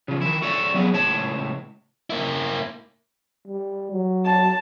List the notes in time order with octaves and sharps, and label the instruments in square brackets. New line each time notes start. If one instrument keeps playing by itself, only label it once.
[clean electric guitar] C#3 F3
D#3 E4
F#4 A4 C#5 D5 E5
F#3 B3 G#4
C#2 A2 C#5 A5
[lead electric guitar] A#3 E4
[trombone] G3
F#3
[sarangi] A5